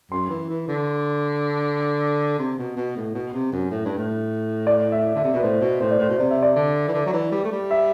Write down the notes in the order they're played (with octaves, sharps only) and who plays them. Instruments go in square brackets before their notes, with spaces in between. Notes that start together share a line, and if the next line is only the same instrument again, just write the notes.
[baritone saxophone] F#2 [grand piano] C6
[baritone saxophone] E3
E3
D3
C3
B2
B2
A2
B2
C3
F#2
A2
G2
A2
[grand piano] D5
E5
[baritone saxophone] D3 [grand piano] E5
[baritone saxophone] C3
[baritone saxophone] B2 [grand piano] B4
[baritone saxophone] A2 [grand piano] C5
[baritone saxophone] B2
[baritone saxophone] A2 [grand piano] C5
[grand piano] D5
[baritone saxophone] A2 [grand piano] C5
[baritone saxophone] B2
[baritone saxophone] C3 [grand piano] D5
[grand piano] E5
D5
[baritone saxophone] D3
E3
D3
F#3
E3
G3
A3
G3
[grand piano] E5